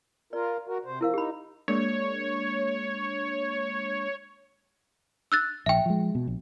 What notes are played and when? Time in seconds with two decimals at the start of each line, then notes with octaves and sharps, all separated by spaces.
0.33 F4 A#4 D5
0.67 F#4 A#4
0.85 C3 C5
1.01 F3 E4 A#4 F5
1.14 D#4 G4 B5
1.68 G#3 A#3 D4 C#5
5.32 E6 F#6 A6
5.66 A#1 E5 G5
5.86 F3 G#3
6.15 B2
6.27 A#1